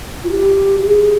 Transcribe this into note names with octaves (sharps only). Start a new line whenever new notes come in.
F4
G4
G4
G#4